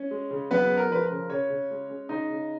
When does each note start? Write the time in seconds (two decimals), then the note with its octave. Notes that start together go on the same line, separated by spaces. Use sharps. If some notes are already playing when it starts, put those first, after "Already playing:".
Already playing: C#4 C#5
0.11 G#3
0.31 C#3
0.51 F#2 B3 B4
0.70 G#3
0.77 A#4
0.90 F3 B4
1.04 A#4
1.11 C#3
1.30 C#3 C#4 C#5
1.50 C#3
1.71 G#3
1.90 G#3
2.09 C#3 D#4 D#5
2.30 C#3